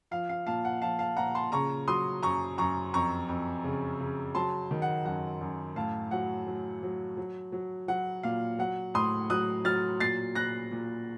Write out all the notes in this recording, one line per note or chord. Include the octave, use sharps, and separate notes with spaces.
F3 F5
F5
A#2 F5 A5
F#5
F3 F5 A5
F5 A5
A#2 F#5 A#5
A5 C6
C#3 A#5 C#6
F#3 C6 D#6
F#2 A#5 C#6
F#2 A#5 C#6
F2 A#5 C#6
F2
C#3
C#3
F#3 A5 C6
D#3
F#5
F#2 F#5
F#2
A2 F5 A5
F#3 F#5
F#3
F#3
F#3
F#3
F#3 F#5
A#2 F5
F#3 F#5
A2 C6 D#6
F#3 D#6 F#6
F#3 F6 A6
A#2 A6 C7
A#2 F#6 A#6
A#2